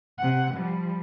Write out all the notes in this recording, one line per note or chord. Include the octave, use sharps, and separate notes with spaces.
C3 F#5
F3 G3